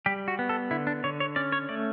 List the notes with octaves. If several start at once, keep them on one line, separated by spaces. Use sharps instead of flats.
G3 G4
F#4
B3
A4
D3 E4
D4
D3 C#5
C#5
C#4 D5
C#5
A3 D5